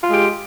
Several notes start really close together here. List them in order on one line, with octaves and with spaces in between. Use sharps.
F4 G#3 G4